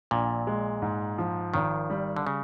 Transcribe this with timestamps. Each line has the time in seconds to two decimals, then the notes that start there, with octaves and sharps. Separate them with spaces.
0.11 A#1 A#2
0.47 G#3
0.82 G#2
1.18 F3
1.54 G#1 D#3
1.90 G3
2.16 D3
2.27 C#3